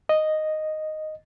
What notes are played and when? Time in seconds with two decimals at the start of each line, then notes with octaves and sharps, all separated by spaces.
0.09 D#5